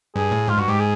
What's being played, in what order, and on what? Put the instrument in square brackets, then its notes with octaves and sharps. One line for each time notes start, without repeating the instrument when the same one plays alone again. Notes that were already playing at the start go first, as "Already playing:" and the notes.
[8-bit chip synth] G2 [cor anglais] G#4
[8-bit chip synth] A2
[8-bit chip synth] G#2 [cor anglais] F4
[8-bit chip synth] G2 [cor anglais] F#4
[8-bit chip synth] G#2 [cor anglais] G4
[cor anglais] G#4